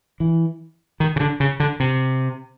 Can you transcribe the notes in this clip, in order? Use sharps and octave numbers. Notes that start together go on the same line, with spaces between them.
E3
D#3
C#3
D3
C#3
D3
C3